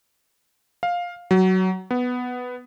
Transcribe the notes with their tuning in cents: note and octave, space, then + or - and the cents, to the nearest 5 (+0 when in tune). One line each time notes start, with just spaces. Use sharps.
F5 +10
F#3 +15
B3 +5